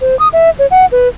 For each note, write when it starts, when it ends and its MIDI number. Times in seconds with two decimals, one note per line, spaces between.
0.01 0.18 72
0.19 0.28 87
0.33 0.50 76
0.59 0.66 73
0.71 0.86 78
0.92 1.08 71